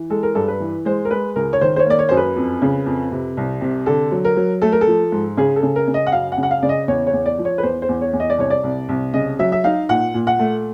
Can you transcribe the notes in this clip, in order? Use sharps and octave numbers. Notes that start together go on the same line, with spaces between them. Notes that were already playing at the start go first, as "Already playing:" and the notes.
Already playing: E3
G#3 A4
A#4
G2 A4
B4
E3
G#3 C5
A#4
G#3 B4
C#2 A#4
C#5
D#3 C5
C5
C#5
A#3 D5
C#5
F#2 C5
B4
F2
C#3
F2
C3
C2
C3
D3 A4
F#3
A#4
F#3
A3 A4
A#4
A4
F3
G#2
C#3 G#4
A4
C#3
A#4
C#3
D#5
F#5
F#2 F5
F#5
C#3
F#5
F5
C#3 D5
D#5
E2 C#5
C#5
E2
D5
F3
C#5
B4
E2 C5
C5
E2
C#5
E2
D#5
D5
C2 C#5
D5
C2
C2
C#3 D#5
F#3 E5
E5
D#4 F5
A#2 F#5
A#2
F#5
A3